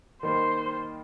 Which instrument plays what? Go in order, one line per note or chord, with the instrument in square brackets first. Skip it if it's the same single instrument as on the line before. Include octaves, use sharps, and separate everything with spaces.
[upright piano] D#3 G3 A#3 [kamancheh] C5